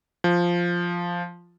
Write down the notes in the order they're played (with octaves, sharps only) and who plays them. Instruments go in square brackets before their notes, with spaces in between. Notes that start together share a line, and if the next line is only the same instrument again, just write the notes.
[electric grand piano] F3